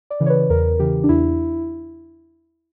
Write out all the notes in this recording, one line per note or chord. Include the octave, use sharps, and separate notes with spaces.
D5
C#3 E3
C#5
B4
E2 A#4
C#3 E3 G4
D4
E2 E4